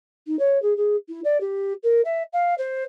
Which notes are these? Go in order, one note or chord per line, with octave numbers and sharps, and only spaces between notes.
D#4
C#5
G#4
G#4
E4
D5
G4
A#4
E5
F5
C5